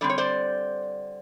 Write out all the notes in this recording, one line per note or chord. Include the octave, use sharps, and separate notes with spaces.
D3 G3 C4 D5
C#5
C5 D5